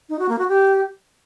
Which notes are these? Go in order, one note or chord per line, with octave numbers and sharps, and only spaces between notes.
D#4
F#4
A#3
F#4
G4